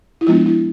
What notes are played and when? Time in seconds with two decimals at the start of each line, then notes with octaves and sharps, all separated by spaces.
0.21 E4
0.27 F3 G#3 B3 D4 F4
0.46 E4